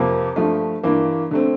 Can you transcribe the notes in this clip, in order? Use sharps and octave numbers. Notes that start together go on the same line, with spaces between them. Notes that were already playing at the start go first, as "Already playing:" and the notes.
Already playing: F2 C3 F3 A#3
G2 F3 A3
G2 E3 A#3
D3 A3 C4